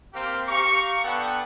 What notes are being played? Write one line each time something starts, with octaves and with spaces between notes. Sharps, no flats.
A#3 C4 G4 F5
G4 F5 A#5 C#6
B3 D4 A4 F#5 G5